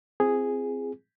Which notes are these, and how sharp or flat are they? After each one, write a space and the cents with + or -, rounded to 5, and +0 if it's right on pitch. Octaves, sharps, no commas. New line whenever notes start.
C4 +0 F4 -40 G#4 -5